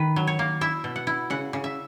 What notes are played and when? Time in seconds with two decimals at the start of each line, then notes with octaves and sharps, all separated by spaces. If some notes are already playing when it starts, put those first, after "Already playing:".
Already playing: D#3 B4
0.16 F#3
0.27 C#5
0.39 A#3
0.61 E4 E5
0.84 B2
0.96 F#5
1.07 E4
1.30 C#3 F#5
1.53 C#3
1.64 E5